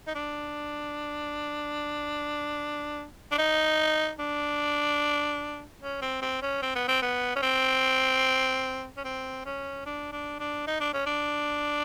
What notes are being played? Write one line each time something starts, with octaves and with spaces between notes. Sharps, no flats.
D#4
D4
D4
D#4
D4
C#4
C4
C4
C#4
C4
B3
C4
B3
C#4
C4
C#4
C4
C#4
D4
D4
D4
D#4
D4
C#4
D4